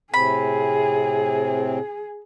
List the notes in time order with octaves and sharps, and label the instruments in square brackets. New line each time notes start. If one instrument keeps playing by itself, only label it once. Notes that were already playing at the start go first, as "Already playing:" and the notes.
[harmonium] A2 C3 C4 [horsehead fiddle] G#4 [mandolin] B5